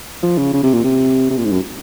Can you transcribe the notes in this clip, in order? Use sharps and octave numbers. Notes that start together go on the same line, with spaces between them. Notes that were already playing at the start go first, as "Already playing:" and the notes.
F3
C#3
C#3
C3
A#2
C3
C3
A#2
G#2
F#2